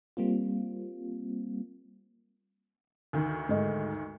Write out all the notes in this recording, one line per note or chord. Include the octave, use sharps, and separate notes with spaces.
G3 A#3 C4 F4
D2 D#3
G#2 A3 D#5